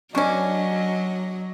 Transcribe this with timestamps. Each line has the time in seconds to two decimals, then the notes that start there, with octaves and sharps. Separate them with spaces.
0.15 F#3 A#3 C#4 D4 D#5 C#6